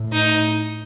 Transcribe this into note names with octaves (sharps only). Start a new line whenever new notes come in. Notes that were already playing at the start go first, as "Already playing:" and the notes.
Already playing: A2
D#4